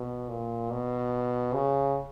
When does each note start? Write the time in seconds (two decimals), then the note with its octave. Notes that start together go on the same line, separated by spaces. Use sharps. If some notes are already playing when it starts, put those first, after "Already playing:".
Already playing: B2
0.30 A#2
0.71 B2
1.54 C#3